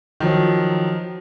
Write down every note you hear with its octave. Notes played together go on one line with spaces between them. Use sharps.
D#3 F3 F#3